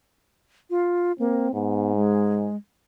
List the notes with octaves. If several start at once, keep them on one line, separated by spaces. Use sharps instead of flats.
F4
A#3 C4
G#2 B3
G#3